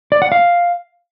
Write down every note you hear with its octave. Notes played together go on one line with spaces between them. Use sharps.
D5
F#5
F5